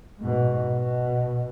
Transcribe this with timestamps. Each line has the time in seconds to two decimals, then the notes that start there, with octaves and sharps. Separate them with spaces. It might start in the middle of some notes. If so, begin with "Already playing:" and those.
0.20 G#2 B2
0.73 B2